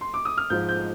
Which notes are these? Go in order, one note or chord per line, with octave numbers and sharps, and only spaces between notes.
C6
D6
D#6
F6
G#2 F3 G#3 G6
G6